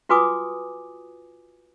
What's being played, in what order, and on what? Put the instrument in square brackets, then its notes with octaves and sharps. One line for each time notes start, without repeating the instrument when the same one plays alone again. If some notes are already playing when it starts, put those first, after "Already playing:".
[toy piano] F4 F#4 B4 G#5 D6 D#6